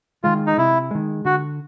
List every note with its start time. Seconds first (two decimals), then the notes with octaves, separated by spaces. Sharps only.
0.24 D#3 G#3 F4
0.47 D#4
0.58 C3 E4
0.91 D#3 G#3
1.25 D3 F#4